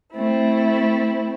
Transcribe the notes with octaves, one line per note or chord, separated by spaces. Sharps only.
A3 C4 E4